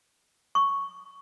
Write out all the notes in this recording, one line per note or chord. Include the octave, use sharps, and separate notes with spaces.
C#6